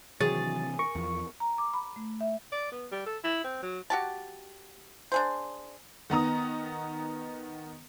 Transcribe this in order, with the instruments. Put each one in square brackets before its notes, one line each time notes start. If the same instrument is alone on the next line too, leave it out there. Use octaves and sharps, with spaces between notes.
[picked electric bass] C3 E3 C4 [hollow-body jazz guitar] D#3 F#3 C#5 [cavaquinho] G#4 [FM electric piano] A6
[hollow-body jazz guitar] A#4 [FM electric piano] C#6
[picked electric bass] E2 F3
[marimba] A#5
D6
B5
A3
E5
[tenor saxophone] D5
B3
G3
A4
E4
C4
F#3
[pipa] F#4 G4 A5
D4 G#4 C5
[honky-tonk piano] D#3 B3 A#5 D#6